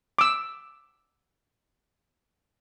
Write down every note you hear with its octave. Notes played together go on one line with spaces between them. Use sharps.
D6 E6